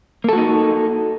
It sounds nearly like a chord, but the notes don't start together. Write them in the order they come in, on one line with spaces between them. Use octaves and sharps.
A#3 A4 F#4 D#4